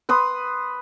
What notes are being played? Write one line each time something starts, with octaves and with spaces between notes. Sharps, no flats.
B4 C6 D#6